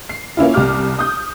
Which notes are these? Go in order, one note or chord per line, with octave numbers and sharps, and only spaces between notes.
C7
A#3 C#4 E4 F4
C2 G4 D6 F6
D#6 G6